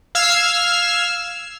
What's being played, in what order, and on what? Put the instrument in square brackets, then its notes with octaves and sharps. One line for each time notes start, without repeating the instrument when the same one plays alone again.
[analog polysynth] F5 E6 F6 G#6 C7